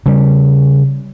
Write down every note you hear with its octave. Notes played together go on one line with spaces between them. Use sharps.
C#3 G3